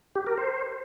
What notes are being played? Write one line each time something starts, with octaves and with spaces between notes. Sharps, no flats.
G4
A#4
C5